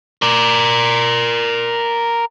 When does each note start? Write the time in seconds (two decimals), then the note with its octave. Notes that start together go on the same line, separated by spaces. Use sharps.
0.22 A#4 D5